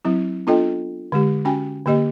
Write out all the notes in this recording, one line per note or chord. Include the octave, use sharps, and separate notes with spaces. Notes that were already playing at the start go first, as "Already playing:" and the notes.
F#3 C4 E4
B3 D4 F4 A4 D#5 G5
D3 G#3 G4
C#4 F#4 G5 G#5
D3 A#3 G4 D#5